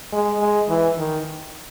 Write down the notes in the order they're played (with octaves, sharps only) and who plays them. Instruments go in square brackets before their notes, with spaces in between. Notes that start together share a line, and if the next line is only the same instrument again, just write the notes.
[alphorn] G#3
G#3
E3
D#3